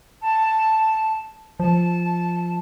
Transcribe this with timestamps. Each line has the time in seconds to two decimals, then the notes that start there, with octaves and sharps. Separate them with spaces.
0.22 A5
1.60 F3 A5